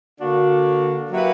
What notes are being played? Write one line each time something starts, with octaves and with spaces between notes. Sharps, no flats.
D3 A#3 D4 F#4
F#3 A#3 E4 G4 B4